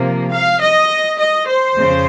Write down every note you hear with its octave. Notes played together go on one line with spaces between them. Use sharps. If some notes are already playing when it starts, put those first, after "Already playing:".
Already playing: C3 F3 A#3
F5
D#5
D#5
C5
F2 C#3